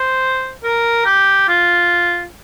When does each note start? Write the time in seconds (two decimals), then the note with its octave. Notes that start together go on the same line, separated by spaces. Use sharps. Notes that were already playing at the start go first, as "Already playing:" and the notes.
Already playing: C5
0.63 A#4
1.05 G4
1.48 F4